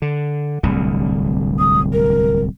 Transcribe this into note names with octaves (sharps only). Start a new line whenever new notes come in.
D3
D1 C2 D3
D#6
A#4